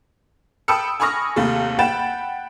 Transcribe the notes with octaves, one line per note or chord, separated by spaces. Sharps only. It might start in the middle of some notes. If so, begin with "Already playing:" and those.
G5 A5 B5 D#6 E6 C#7
G#5 B5 C#6 D#6 F6 A#6
D#2 C3 A3
F#5 G5 B5 A6 E7